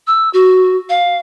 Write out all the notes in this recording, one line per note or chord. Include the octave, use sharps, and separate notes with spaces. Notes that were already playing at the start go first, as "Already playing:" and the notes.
E6
F#4
F5